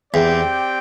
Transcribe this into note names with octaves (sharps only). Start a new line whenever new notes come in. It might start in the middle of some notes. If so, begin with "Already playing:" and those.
E2 C4 G4 D5 G5